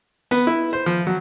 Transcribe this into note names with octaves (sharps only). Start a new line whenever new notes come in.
B3
E4
C5
F3
F#3